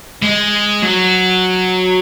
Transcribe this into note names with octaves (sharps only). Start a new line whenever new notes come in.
G#3
F#3